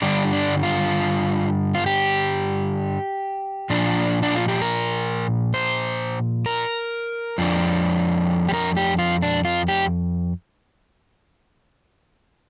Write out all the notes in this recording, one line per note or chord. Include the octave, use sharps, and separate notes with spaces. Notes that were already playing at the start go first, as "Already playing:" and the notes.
G2 D3 G3 D4
D4
F4
F4
G4
A#2 F3 D4
D4
F4
G4
A#4
C5
A#4
F2 F3 D4
G4
A#4
G4
F4
D4
F4
G4